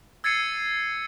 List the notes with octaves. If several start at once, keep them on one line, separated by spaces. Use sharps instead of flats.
E6 G#6 A6 C7 C#7 D#7